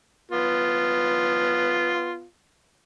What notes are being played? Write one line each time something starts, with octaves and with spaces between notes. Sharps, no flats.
B3 F4